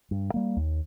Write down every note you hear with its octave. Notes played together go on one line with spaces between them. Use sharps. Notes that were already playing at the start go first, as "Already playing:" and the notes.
G2
G3 A#3
D#2